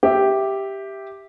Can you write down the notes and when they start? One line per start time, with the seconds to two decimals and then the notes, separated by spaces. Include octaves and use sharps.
0.03 G4 E5